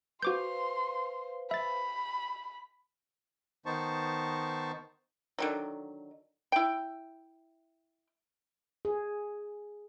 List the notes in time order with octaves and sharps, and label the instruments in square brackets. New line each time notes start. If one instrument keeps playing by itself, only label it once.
[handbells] F#4 D6 G6 [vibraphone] B4 C5 F5 [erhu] C6
[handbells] E5 A6 [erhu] B5
[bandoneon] D#3 B3 D#4 C5 A5 C#6
[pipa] D3 D#3 F#3
E4 G5
[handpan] G#4